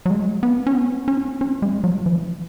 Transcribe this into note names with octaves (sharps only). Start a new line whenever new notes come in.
F#3
G#3
B3
C#4
B3
C#4
C#4
G#3
F#3
F3